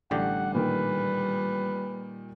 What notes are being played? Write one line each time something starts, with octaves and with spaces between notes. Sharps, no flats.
A1 D3 G3 G4 F#5
A#2 D#3 B4